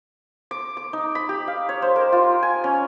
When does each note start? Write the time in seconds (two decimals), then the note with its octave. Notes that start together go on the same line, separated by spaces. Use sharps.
0.51 D6
0.77 D6
0.93 D#4
1.15 B5
1.29 G4
1.48 F5
1.69 C#5
1.82 C5
1.96 A#4
2.12 F4
2.43 G#5
2.64 C#4